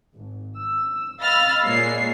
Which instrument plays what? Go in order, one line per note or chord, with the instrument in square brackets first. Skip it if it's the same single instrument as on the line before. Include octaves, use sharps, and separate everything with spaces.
[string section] G#1
E6
D#5 F5 B5 E6 F6 A6
A#2 G#3 A#3 C#5 C7